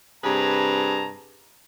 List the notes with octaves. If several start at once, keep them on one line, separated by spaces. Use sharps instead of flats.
G2 C3 G#4 B4 A5 A#5